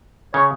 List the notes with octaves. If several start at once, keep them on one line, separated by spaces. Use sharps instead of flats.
C#3 C#5